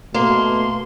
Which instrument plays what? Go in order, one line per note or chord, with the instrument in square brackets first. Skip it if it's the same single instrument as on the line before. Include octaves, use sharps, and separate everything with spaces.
[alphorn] B2 [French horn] A3 [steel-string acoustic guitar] A#3 [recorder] C6